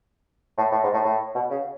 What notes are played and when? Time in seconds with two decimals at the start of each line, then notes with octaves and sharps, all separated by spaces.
0.57 A2
0.72 A2
0.83 G#2
0.93 A2
1.04 A2
1.35 B2
1.50 C#3